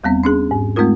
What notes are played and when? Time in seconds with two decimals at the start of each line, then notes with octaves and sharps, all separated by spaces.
0.04 E2 G3 B3 C4
0.23 C#4 D4 G#4
0.51 G#2
0.76 G#3 A3 C4 D#4 F4 A#4